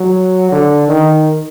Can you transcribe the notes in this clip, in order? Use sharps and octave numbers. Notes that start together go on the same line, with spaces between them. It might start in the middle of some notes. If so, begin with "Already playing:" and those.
Already playing: F#3
D3
D#3